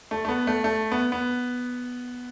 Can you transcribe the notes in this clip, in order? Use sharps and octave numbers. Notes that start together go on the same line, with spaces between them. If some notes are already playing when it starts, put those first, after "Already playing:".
A3
A3
B3
A3
A3
B3
B3